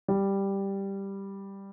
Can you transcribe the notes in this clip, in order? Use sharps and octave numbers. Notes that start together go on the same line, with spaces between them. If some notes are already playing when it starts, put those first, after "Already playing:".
G3